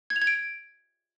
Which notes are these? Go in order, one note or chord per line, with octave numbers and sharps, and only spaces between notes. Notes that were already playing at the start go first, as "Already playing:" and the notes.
G#6
F7
G#6
D7